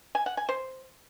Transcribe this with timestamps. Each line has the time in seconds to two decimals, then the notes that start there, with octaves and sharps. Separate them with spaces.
0.15 G#5
0.26 F#5
0.37 G#5
0.49 C5